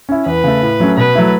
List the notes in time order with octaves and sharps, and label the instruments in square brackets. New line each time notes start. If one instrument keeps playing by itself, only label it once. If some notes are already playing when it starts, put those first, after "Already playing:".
[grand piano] C#4 E4
[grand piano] E2 [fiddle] B4
[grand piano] C#3 A3
A2
F#3 A3 C#4
[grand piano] B2 [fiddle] B4
[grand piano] F#3 A3 E4